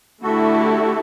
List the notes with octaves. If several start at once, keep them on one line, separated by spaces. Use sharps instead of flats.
D3 A3 E4 F#4 G4 A4